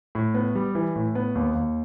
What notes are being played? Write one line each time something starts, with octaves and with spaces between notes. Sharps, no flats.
A2
B3
G3
E3
A2
B3
D#2
D#2